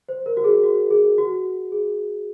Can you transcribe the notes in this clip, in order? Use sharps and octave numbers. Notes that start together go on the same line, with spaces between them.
C5
A#4
F#4
G#4
F#4
G#4
F#4
G#4